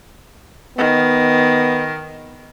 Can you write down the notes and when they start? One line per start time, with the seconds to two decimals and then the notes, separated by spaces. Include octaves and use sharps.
0.78 D#3 B3